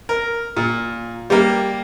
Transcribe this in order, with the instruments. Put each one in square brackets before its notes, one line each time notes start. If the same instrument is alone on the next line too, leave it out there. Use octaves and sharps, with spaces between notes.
[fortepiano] A#4
A#2
G3 A#3